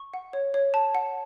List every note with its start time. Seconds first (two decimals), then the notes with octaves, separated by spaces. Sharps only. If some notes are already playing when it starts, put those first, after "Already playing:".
Already playing: C#6
0.14 F#5
0.33 C#5
0.54 C#5
0.74 A5
0.95 F#5